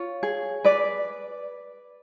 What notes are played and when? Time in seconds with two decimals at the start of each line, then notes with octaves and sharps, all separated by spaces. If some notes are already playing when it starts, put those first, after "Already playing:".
Already playing: F4 C#5
0.23 G#4
0.64 B4 D5